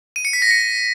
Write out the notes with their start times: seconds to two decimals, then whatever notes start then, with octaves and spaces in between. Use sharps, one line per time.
0.16 D#7
0.25 C#7
0.33 B6
0.42 A#6
0.51 C#7